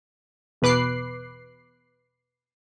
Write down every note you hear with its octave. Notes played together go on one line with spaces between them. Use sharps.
E2 B2 B4 D6 F#6 C7